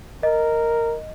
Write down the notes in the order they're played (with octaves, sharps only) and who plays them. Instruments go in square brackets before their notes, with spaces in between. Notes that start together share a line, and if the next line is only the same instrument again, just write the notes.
[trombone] A#4 [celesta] D#5